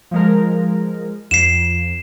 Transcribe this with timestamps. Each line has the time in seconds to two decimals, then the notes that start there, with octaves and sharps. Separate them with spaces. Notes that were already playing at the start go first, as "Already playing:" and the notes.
0.11 F3 G#3 A#4
1.31 F2 C7 E7